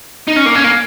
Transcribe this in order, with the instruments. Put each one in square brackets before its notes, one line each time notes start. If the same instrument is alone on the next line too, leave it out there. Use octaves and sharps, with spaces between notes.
[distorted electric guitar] D#4
C#4
A#3
C#4
A#3